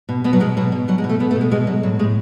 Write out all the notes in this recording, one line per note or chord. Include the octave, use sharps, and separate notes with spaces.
B2
B2 B3
F#3
B2 G#3
B2 F#3
B2
B2 F#3
G#3
B2
A3
B2 B3
A3
B2
G#3
B2 G#3
B2 F#3
A2 F#3
A2 G#3